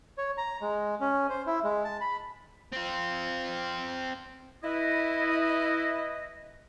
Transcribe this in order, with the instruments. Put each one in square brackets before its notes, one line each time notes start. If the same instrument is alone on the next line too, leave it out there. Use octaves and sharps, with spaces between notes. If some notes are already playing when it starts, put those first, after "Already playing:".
[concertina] C#5
A#5
G#3
C#4
C5
E4
G#3
A5
B5
[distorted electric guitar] C4 F4
[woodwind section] E4 B4 D#5